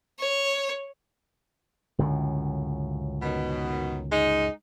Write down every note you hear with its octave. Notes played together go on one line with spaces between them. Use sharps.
C#5
C#2 F#2 A2 D3
B2 D#3
G#3 D#4